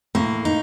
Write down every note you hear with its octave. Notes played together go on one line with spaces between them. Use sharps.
A2 A#3
D#4